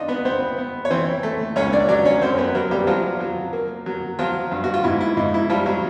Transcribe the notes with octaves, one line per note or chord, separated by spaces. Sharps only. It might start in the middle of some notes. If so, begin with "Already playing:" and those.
Already playing: D4 D#4 F4 D#5
B3 B4
B3 C4 C5
B3
C#5
E3 C4 C5
A3
C#2 C#4 C#5
D4 D5
F#3 D4 D5
C#4 C#5
F#2 C4 C5
B3 B4
F#3 A#3 A#4
G3 G4
F3 F#3 F4
F#3
A#3
F#3
F3 F#3 F4
G2
F#4
F4
G#2 E4
E4
G#2 D#4
E4
F3 G3 F4
F#3 F#4